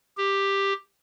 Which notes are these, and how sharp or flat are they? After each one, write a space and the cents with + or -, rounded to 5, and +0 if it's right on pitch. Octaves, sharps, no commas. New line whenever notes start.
G4 +5